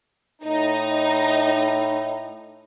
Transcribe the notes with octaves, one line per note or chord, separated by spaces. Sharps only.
A2 D#4